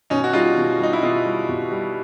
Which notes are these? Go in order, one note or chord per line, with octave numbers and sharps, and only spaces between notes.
B2 C#4 D#4
F#4
G3 D#4 F4
B2
G3 D#4
E4
B2 D#4 F4
G3
B2
G3